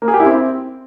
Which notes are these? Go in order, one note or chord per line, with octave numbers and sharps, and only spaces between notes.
A#3
G#4
G4
E4
C4